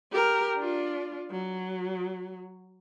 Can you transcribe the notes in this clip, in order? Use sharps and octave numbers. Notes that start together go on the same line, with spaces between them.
G4 A#4
D4 F4
F#3